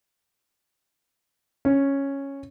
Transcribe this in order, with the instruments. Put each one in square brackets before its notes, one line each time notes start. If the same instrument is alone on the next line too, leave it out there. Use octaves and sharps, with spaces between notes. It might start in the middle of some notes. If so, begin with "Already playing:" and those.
[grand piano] C#4